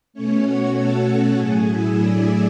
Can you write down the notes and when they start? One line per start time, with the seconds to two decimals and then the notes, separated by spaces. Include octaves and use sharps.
0.13 B2 A3 C#4 C#5
0.44 F#4 F#5
0.75 A4 A5
1.06 A4 A5
1.36 A2 F#3 A3 G#4 G#5
1.67 E4 E5
1.97 D4 D5